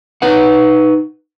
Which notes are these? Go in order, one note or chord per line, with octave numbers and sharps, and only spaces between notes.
D#4 B4 F#5